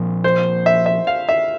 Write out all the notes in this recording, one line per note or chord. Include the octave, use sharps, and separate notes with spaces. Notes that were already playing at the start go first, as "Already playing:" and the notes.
Already playing: A#2 F3 C4
C5
E5
E5
F5
E5